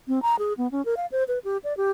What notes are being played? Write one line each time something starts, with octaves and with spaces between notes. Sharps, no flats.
C4
A#5
G#4
B3
C#4
A#4
F5
C5
B4
G4
D5
G4